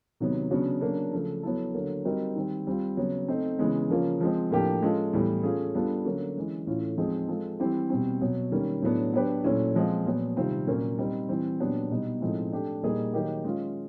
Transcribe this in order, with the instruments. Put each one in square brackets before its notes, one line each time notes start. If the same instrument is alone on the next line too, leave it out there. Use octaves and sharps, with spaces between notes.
[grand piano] C3 D#3 F#3 B3
C#3 F#3 B3 D4 F#4
C#3 F#3 A#3 D4
C#3 F3 A3
F#3 B3 E4 A4
D3 F#3 A#3
G3 C4 D#4 F#4 A#4
D#3 G3 C4
G3 C4 F4
C#3 F#3 B3
A3 C4 D#4
C#3 E3 G#3 B3
C#3 F3 A#3 C#4 F4
F3 G#3 C4
A2 F3 A#3 D4 G4
G#3 C#4 F4 A4
A2 E3 G3 B3
A3 C#4 F4 G#4
G3 B3 D4 F4 A4
D3 F#3 A#3 C#4 F#4
E3 G#3 C#4
A2 E3 A3 C#4 F4
F3 G#3 C4 D#4 G#4
G#3 C4 F4 A4
E3 G3 C4 E4 G4
B2 G3 C4
B2 F#3 B3
D#3 G3 A#3 C#4
A2 F#3 B3 D4
F#3 B3 D4 G4 B4
A#2 F#3 A3 C#4 E4
F3 G#3 C4 F4
A#2 F#3 B3
C3 D#3 G3 C4 F4
A#2 F#3 A#3 C#4
G3 C4 D#4
E3 G3 C4
A#2 F#3 B3 D4 G4
B2 G3 B3 D#4
A2 F3 G#3 C4 D#4
A3 D4 G4
A#2 G3 A#3 D#4 G#4
D#3 F#3 A#3 D#4 G4
G#3 C#4 F4